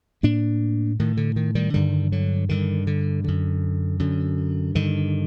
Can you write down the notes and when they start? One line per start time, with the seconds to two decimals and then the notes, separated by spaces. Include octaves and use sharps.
0.23 A2 A#3 D4
0.99 A2 D#3
1.17 D3
1.36 D#3
1.55 D#3 G3
1.74 G2 D3 D#3 G3
2.12 D3 F#3
2.49 G2 D3 D#3
2.87 D3
3.24 F#2 D3
4.00 F#2 D3
4.75 G2 D3 D#3